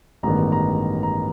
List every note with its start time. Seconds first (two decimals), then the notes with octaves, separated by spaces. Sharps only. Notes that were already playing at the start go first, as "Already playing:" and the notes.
0.23 A1 G2 D#3 G#3 B3 A#5
0.52 A#5
1.03 A#5